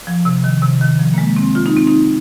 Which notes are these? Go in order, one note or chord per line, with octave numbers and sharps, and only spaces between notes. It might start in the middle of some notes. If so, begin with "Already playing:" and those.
F3
C3
D#3
C3
D#3
F3
A#3
G#3
C4
F4
D#4
C4
D#4